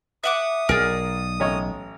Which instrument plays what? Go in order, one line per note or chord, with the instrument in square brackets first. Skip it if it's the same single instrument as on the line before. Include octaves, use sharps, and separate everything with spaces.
[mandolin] E5 F#5 D6 [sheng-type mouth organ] D#6
[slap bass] B1 [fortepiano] G#4 [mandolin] A#4 D5
[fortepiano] A1 C#5 D#5